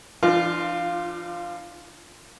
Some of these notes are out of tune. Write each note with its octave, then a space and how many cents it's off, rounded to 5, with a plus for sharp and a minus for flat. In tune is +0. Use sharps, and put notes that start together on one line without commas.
F3 -45 D4 +30 F4 +0